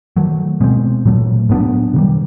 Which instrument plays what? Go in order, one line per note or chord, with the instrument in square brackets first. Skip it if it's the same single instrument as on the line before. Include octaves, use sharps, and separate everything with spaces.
[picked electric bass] D#3 F#3 A3
B2 G#3 C4
A#2 F#3 A3
A2 F#3 B3 D4
C3 D#3 G3